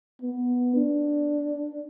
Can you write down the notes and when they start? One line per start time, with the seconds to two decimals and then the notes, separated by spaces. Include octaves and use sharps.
0.22 B3
0.75 D4